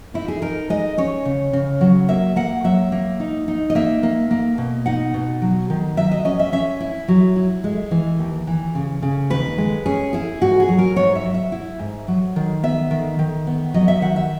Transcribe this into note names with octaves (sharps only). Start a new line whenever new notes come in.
D#4 E4
G#4
D#4 A#4
G#3 D#5
C#4 C#5
C#3
C#3
F#3
A#3 E5
A#3 F#5
F#3 E5
A#3
D#4
D#4
D#5
A#3 E5
A#3
A#3
B2
D#4 F#5
B2
F#3
D#3
F#3 E5
D#5
C#4 D#5
E5
C#4 E5
E4
F#3
E4
G#3
E3
D#2
E3
C#3
C#3
D#2 B4
G#3
C#4 G#4
E4 G#4
G#2 F#4
G#4
F#3
A#4
G#2 C#5
E5
F#3
E5
E4
G#2
F#3
D#3
B3 E5
D#3
D#3
B3
F#3 D#5
E5
D#3 F#5
E5